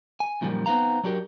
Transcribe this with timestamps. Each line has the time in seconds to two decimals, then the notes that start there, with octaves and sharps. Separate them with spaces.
0.20 G#5
0.41 F#2 A#2 D#3 F3 G3
0.66 B3 C4 D#4 B4 F5 A#5
1.03 F#3 D4 F#4 G4 A#4